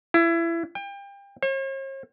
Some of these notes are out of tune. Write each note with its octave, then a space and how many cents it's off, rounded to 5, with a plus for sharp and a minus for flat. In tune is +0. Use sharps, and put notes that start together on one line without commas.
E4 +25
G5 +30
C#5 -45